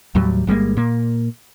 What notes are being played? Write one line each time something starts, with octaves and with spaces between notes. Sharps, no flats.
D#2 A2 F#3 G3
G1 G3 G#3 A#3
A#2 A#3